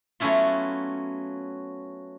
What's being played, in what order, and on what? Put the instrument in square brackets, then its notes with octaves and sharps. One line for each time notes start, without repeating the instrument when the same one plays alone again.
[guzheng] F#3 A3 B3 C#4 E4 F4